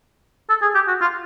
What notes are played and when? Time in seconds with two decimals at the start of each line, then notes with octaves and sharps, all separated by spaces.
0.49 A4
0.62 G#4
0.75 G4
0.88 F#4
1.01 F4